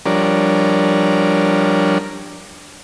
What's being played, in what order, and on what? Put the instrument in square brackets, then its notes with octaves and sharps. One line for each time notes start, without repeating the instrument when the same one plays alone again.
[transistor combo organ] F3 G3 D4 A#4 C#5